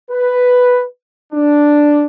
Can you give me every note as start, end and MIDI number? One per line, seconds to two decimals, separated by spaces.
0.10 0.84 71
1.33 2.06 62